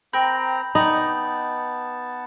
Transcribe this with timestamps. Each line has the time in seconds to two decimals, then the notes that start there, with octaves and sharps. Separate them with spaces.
0.13 C4 A#4 G5 A#5 B5 G6
0.75 B3 D#4 G4 A5 B5 C#6